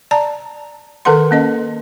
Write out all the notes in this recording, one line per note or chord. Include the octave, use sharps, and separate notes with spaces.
D5 A5 A#5
D#3 A4 B4 F#5 C6
A#3 C#4 D#5